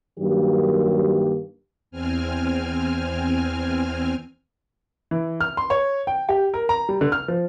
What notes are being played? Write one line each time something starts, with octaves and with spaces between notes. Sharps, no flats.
G2 D#3 F#3 A#3 G4
E2 C4 G#5 F6
E3
F6
C6
C#5
G5
G4
A#4
A#5
G3
D3
F6
F3